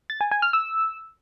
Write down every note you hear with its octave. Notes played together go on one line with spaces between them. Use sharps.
A6
G#5
G#5
F6
E6